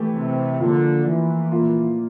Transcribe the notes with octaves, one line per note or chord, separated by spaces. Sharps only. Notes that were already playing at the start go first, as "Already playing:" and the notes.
Already playing: E3 A3 E4 G4
C3
D3 F3 A#3 F4
E3
A#2 F3 A#3 F4